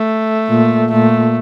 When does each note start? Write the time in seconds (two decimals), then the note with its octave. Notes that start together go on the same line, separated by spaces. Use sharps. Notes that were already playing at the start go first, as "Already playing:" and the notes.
Already playing: A3
0.49 A#2
0.91 A#2 A3